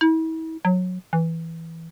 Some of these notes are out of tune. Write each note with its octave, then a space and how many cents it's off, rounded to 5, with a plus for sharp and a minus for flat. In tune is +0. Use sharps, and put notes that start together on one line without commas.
E4 -40
F#3 -20
E3 -5